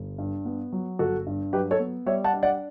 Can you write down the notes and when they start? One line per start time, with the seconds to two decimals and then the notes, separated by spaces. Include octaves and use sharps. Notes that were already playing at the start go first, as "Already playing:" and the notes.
Already playing: G1
0.18 G2
0.45 B3
0.72 F#3
0.99 G1 F#4 A4
1.26 G2
1.53 F#3 G4 B4
1.71 A4 C#5
1.80 B3
2.06 G3 C#5 E5
2.24 F#5 A5
2.33 D4
2.43 D5 F#5